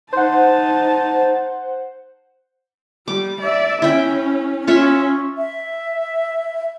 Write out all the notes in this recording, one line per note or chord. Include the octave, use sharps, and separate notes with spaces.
D#4 C5 F#5 A5
G3 D6
D5 E5
C#4 E4 G5
C#4 F4 C#5 E5
E5